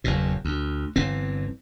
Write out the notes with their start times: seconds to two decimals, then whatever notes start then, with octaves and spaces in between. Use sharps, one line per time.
0.04 F#1 E2 B2
0.45 D2
0.96 G1 E3 C4